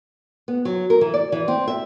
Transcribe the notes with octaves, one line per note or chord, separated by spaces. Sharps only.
B3
F#3
A#4
E3
D5
E3
C4
E5